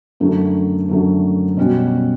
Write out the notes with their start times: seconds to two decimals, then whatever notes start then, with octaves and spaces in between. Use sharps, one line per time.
0.20 F#2 D3 F#3 A3
0.89 F#2 D3 F#3 A3
1.57 B2 G3 C#4 F#4